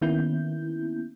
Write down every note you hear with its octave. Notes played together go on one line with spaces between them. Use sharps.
D#3 A#3 B3 C#4 E4 G6